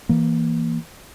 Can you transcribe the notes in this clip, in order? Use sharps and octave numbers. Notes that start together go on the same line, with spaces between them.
E3 A#3